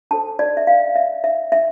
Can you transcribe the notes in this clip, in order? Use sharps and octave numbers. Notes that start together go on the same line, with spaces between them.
D4 A4 C5 A5
D5
E5
F5
E5
E5
E5